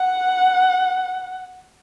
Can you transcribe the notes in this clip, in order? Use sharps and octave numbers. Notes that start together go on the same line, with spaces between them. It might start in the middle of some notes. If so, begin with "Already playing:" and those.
Already playing: F#5